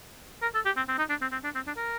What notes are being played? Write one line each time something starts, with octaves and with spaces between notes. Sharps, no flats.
A#4
A4
G4
C4
C4
D#4
D4
C4
C4
D4
C4
D4
A#4